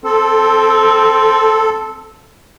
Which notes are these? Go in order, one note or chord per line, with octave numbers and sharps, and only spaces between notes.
C4 A4